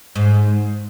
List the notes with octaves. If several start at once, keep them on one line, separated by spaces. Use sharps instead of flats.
G#2